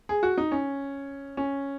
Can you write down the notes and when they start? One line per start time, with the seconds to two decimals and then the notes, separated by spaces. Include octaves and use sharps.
0.09 G#4
0.23 F#4
0.38 D#4
0.52 C#4
1.37 C#4